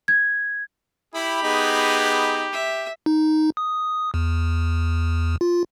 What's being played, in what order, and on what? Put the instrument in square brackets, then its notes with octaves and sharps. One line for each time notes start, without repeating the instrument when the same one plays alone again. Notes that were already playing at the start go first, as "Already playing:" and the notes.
[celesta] G#6
[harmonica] E4 [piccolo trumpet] G4 [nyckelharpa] B5
[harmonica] B3 D#4 G#4
[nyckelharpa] E5
[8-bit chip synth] D#4
D#6
E2
F4